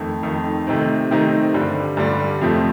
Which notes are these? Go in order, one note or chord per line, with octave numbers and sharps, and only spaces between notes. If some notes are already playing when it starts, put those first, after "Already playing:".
Already playing: F2 D#3 A3
F2 D#3 A3
C3 D#3 A3 C4 D#4
C3 D#3 A3 C4 D#4
G2 D3 G3
G2 D3 G3
F2 C3 F3 A3 C4